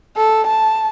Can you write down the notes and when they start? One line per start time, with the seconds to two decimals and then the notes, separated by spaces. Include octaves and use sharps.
0.16 A4
0.47 A5